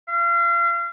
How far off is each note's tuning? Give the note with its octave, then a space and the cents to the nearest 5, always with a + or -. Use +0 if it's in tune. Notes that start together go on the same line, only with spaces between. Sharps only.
F5 -35